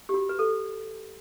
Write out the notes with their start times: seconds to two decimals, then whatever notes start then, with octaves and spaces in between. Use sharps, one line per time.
0.09 G4
0.14 F#4
0.29 B4
0.39 A4